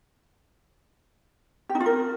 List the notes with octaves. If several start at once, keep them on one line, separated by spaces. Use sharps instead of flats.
G4
D#4
F4
A#4